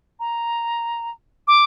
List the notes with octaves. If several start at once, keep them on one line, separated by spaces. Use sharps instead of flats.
A#5
D6